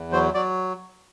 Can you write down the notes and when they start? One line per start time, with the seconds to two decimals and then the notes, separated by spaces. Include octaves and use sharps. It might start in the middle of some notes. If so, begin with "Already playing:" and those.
Already playing: E2
0.12 F#3 C5
0.34 F#3 D5